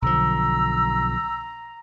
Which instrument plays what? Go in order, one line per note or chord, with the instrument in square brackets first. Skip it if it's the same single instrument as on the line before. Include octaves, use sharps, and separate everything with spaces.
[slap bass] B1 D3 F3 [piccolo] A#5 [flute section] E6